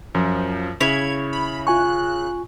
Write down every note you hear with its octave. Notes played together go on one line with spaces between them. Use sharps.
F#2 F3
C#3 E4 C#5 G#6
B5
F4 G#5 C#6 F#6